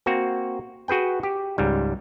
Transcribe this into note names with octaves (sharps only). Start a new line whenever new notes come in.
A#3 C4 F#4
F#4 G#4 B4 G5
G4
C#2 G#2 G3